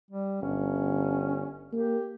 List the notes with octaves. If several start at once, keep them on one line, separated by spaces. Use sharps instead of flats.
G3
G1 C#4
A#3 G4